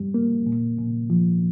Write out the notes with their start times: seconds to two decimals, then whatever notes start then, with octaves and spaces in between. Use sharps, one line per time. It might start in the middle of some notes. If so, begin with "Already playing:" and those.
Already playing: G2 G3
0.14 A#3
0.46 A#2
0.78 A#2
1.10 F3